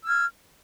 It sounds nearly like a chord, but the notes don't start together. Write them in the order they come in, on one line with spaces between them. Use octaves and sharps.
E6 F6 G#6